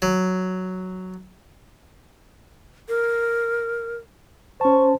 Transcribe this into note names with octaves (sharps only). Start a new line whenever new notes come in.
F#3
A#4
C#4 C5 A5 C#6